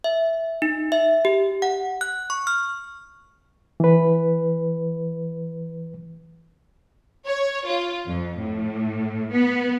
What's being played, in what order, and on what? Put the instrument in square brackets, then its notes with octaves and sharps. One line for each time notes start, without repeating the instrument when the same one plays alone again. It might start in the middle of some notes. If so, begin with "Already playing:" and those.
[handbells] E5
D#4
E5
G4
F#5
F#6
C#6
F6
[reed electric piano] E3 B4
[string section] C#5
F4
F2
A2
B3